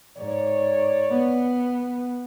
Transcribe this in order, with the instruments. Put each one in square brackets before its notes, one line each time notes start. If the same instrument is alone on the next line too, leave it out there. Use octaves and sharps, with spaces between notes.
[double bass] G#2 [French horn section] C#5 D5
[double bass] B3